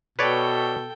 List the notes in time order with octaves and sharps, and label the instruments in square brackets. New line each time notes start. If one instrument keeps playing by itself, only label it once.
[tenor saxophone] B2 [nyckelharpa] A4 G5 [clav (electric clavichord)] B4 C#5 D5